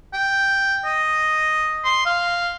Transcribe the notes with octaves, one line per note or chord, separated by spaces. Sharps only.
G5
D#5
C6
F5